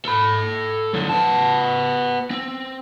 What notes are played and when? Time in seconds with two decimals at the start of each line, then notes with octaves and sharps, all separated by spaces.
0.05 A4 B5
0.93 F#2 D3
1.09 B3 A5
2.31 C4